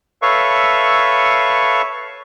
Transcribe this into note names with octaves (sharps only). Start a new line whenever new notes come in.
A4 B4 C#5 E5 F5 C#6